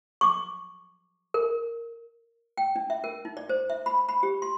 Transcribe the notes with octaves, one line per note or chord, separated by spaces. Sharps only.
C#6 D6
A#4
G5
D4
E5
A#4
D#4
D5
C5
E5
B5
B5
G4
C6